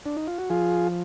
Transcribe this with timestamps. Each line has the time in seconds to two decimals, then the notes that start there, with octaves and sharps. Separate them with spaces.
0.06 D4
0.17 D#4
0.27 F4
0.38 F#4
0.50 F3 F4 G#4